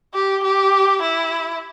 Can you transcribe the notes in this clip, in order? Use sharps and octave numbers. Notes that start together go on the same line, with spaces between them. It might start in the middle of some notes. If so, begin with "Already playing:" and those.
G4
G4
E4